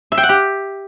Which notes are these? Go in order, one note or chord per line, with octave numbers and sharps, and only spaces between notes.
E5
G5
F#5
G4